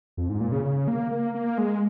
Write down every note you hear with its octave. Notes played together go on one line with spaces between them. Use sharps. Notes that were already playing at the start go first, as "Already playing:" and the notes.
F2
G#2
A#2
C#3
C#3
A#3
A#3
A#3
G#3